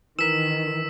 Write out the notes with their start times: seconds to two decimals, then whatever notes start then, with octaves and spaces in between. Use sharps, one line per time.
0.19 D#3 E3 A#4 E6 B6 E7